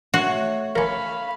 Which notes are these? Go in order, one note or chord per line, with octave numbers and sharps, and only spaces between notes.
A3 F#4 C#5
C#4 A#4 F5 B5